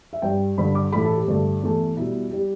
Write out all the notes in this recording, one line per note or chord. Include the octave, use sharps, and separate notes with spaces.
E5
G2 G3 G5
G2 D3 G3 B5
D6
A2 E3 A3 B5
A4
G4
G2 D3 A3
E2 E3 A3
B2 G3 E4
G3 G4